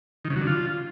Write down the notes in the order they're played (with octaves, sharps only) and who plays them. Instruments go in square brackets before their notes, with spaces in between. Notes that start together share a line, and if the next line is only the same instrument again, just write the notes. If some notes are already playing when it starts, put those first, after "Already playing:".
[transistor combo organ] D#3
C#3
F#3
D3
F4